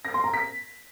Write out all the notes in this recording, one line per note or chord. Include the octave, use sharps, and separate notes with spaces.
A#6
C6
A#5
B6